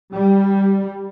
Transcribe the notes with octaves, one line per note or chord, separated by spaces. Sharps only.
G3